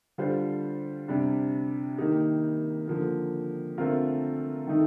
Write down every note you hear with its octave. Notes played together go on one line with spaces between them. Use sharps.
D3 G3 D4 F4 C5
C3 G3 D4
D#3 A#3 D#4 G4
D3 F3 A#3
D3 A3 C4 F4 A#4
D#3 A3 D#4